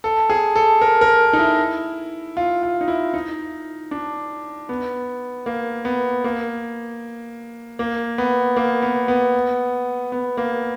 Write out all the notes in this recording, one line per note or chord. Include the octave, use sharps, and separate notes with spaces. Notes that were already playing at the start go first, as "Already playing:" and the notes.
A4
G#4
A4
A#4
A#4
D#4
E4
F4
F4
D#4
E4
D#4
D4
B3
A#3
B3
A#3
A#3
B3
A#3
B3
B3
B3
A#3